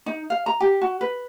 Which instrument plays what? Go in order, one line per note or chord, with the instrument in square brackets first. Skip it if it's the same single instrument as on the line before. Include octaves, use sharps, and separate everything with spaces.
[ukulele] D#4
F5
A#5
G4
F#4
B4